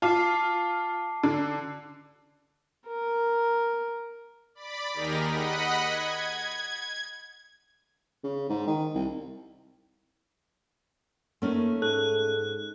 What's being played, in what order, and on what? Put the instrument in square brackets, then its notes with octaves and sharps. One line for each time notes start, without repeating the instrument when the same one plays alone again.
[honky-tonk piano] F4 [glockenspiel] A5 D6 C7
[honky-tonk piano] D3
[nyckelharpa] A#4
[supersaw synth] D5 B5
D#2 D#4 G4 G#4 A#4 A#6
D#5 F#5 B5
G#6
[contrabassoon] C#3
G#2
D#3
C2
[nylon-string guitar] A3 C#4 D#4 [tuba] A#3
[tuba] G#2 [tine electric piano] A4 [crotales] F#6